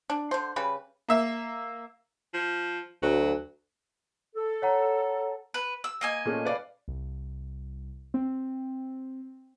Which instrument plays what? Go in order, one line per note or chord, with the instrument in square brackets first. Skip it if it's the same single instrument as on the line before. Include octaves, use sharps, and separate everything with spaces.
[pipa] D4
D3 C5
C#3 G3 G4 B4
[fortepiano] A#3 E5
[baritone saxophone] F3
[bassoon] D2 [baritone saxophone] F#3
[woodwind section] A4
[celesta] C#5 F#5 A#5
[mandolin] B4
E6
A#3 D#5 G#5
[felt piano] A#2 A3 C#4
B4 D5 F5
[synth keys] C2
C4